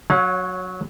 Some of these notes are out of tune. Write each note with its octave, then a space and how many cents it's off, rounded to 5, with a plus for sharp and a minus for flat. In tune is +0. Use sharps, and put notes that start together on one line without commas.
F#3 -10 C#4 +5 F5 +45